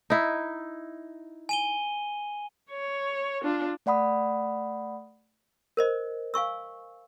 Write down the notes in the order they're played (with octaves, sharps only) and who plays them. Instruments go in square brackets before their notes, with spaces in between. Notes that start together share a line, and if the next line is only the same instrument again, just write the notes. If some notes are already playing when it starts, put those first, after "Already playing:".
[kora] D#4 E4
[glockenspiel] G#5 D#7 G7
[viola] C#5
D4 F4
[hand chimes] A3 D5 F#5 B5 D#6
[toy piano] A#4 C5 D#5
F5 G#5 C#6 E6